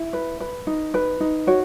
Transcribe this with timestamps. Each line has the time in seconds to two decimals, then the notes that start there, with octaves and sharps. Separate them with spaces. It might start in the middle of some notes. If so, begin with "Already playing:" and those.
Already playing: E4
0.13 B4
0.40 B4
0.67 D#4
0.94 B4
1.20 D#4
1.47 F#4 C#5